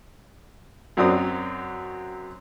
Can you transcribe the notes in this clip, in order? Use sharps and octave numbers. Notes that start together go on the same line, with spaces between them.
F#2 F#3 C4 F#4 D5 D#6